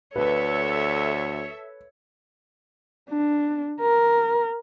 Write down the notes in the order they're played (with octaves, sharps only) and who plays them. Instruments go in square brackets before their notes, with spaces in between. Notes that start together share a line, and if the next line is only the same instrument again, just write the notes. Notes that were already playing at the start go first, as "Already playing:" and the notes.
[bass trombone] D2 [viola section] A4 E5 [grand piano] B4 [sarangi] C#5
[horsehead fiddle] D4
A#4